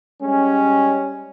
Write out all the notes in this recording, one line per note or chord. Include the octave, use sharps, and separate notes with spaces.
G3 G#3 C#4